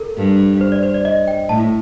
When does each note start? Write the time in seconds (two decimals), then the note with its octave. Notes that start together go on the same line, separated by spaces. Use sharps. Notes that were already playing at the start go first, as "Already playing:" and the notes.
Already playing: A4 A#4
0.17 G2
0.61 C5
0.72 D5
0.83 C5
0.94 D5
1.05 D#5
1.28 G5
1.49 A2 A5